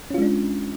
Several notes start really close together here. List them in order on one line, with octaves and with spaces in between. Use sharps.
C#4 F4 G#3 D4